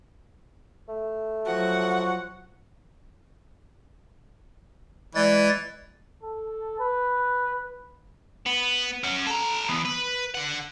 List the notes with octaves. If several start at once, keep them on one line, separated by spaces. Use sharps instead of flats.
A3
F3 F#3 F#4 F#5
E3 G#3 D5 A6
A4
B4
B3
C#4 F#4
A4 A#5
E3 B3
B4
D3 F#5